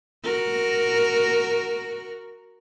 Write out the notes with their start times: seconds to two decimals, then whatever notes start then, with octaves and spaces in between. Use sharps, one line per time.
0.24 F#4 A#4